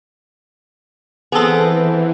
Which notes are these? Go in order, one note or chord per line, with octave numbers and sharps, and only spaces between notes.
E3 B3 C4 G#4 A4